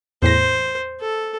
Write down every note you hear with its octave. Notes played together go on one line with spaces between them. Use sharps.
E2 A2 C5 A#6
A4